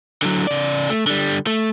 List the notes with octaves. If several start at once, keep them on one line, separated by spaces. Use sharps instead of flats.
D3 F#3
C#3 D5
A3
D3 G3
A3